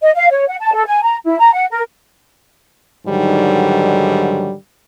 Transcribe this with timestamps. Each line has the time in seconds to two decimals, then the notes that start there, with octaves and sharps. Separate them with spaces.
0.02 D#5
0.15 F5
0.31 C#5
0.47 F#5
0.59 A5
0.73 A4
0.86 G#5
1.02 A#5
1.26 E4
1.40 A#5
1.53 F#5
1.70 A#4
3.06 G#2 D3 D#3 F#3 G3